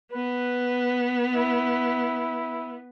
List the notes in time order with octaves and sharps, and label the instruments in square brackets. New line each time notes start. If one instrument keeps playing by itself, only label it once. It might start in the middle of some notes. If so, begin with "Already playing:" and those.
[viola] B3 [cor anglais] B4
[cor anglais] E4